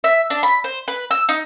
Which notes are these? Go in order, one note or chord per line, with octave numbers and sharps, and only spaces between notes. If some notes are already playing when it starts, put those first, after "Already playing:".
E5
D4
B5
C5
B4
E6
D#4